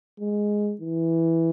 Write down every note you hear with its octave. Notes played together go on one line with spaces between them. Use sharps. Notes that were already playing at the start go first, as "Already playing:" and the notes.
G#3
E3